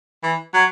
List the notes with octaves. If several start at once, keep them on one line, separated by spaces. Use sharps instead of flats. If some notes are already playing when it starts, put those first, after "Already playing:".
E3
F#3